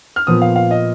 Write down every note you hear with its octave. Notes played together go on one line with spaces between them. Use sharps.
F6
A#2 F3 B3 D#6
F5
F5
D#5